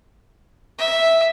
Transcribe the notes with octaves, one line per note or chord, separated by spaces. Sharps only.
E5